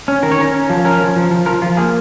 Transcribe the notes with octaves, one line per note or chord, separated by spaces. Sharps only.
C#4
D#3 A#4
C#5
C#4 A#4
C#4
F3
C#4 A#4
F3
F3
F3
F3 A#4
F3 F4
A#3 G#4